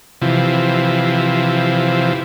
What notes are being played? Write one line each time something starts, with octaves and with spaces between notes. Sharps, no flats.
C3 E3 F3